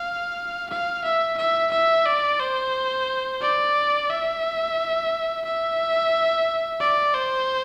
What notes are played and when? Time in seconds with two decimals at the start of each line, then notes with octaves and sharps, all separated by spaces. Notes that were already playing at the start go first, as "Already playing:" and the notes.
Already playing: F5
0.70 F5
1.04 E5
1.38 E5
1.71 E5
2.06 D5
2.39 C5
3.41 D5
4.09 E5
5.45 E5
6.80 D5
7.14 C5